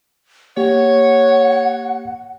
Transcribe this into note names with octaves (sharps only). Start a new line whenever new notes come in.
A#3 G4 C#5 F#5